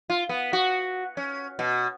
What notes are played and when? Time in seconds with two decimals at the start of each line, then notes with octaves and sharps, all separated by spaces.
0.10 F4
0.29 B3
0.53 F#4
1.17 C#4
1.59 B2